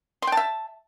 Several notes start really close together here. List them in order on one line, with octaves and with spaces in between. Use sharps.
C6 G5 A5 E5